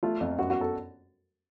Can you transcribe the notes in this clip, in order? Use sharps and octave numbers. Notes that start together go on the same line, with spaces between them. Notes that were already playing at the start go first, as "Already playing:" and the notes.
A3 F4
F2
F#2 F#4
F#4
A4